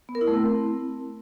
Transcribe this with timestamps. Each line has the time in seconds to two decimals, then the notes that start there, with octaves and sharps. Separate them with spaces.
0.09 B3
0.15 A#4
0.21 E4
0.27 A3
0.34 C4